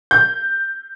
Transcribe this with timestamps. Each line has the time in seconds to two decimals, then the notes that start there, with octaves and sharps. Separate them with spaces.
0.11 G6